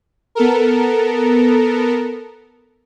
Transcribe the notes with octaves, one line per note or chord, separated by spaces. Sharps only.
B3 A4 A#4